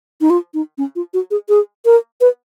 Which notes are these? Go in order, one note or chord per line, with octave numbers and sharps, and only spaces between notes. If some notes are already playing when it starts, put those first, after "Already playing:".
D#4
F4
D#4
C#4
F4
F#4
G#4
G#4
A#4
B4